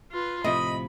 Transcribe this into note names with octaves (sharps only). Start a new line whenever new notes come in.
F4 B4
A2 C3 F3 D#5 B5